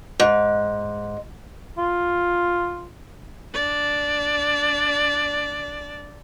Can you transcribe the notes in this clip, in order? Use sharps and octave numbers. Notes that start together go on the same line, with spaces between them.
G#2
F4
D4 D5